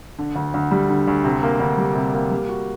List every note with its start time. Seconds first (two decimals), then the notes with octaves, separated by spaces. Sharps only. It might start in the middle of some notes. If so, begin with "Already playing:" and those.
0.19 D3
0.36 D2
0.54 D2
0.71 G3
0.90 D3
1.08 D2
1.24 C3
1.43 A#3
1.60 D2
1.77 G3
1.95 C3
2.14 A#3
2.31 G3
2.49 F#4